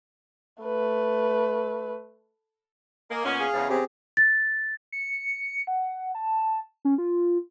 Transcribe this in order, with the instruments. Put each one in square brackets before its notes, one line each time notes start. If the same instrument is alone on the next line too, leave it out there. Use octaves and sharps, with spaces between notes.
[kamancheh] A3 B4
[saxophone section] A#3 [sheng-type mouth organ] D#5 G#5
[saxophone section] A#2 B3 C#4
[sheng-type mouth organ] G#4 F5
[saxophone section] E2 C#3
[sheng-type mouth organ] C4 G4 G#4
[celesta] A6
[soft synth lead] C#7
F#5
A5
C#4
F4